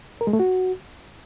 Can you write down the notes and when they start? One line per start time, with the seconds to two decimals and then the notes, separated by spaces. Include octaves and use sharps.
0.21 A#4
0.27 G#3
0.33 A3
0.40 F#4